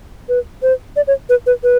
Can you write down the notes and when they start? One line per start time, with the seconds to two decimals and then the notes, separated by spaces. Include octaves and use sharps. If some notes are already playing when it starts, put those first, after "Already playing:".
0.29 B4
0.62 C5
0.96 D5
1.07 C#5
1.29 B4
1.46 B4
1.63 B4